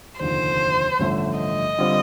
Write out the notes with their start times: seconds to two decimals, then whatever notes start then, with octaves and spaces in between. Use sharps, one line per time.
0.20 F1 D#2 D3 F3 C5
0.99 A1 G2 D3 F3 A3
1.39 D#5
1.78 D3 G3 C4 F4